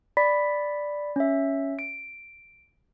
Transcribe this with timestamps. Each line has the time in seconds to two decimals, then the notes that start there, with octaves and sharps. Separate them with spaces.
0.17 D5 B5 B6
1.16 C#4 E5
1.79 D7